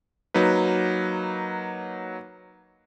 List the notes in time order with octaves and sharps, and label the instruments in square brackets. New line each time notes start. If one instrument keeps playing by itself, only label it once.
[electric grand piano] F#3 A#3 D#4 B4